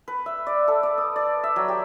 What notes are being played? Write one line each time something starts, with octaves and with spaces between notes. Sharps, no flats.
B4
E5
D5
A4
D5
D#6
D5
E5
F#3
G4